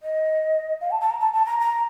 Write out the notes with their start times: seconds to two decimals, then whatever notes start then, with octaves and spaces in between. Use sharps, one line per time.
0.03 D#5
0.81 F5
0.91 A5
1.01 A5
1.10 A#5
1.20 A5
1.33 A5
1.46 A#5
1.60 A#5